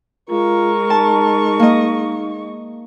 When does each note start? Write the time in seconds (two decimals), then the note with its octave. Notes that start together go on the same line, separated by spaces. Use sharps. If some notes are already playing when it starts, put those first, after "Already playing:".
0.30 G#3 F4 A#4 C#6
0.90 D#4 A5
1.59 A#3 D#5